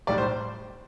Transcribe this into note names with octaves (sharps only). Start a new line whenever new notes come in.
B1 A2 G3 D5
C5